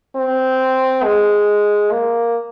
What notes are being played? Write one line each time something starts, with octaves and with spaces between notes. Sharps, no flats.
C4
G#3
A#3